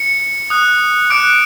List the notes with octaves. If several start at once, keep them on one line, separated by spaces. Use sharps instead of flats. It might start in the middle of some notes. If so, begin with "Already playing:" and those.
Already playing: C#7
D#6 F#6
D6 F#6 D7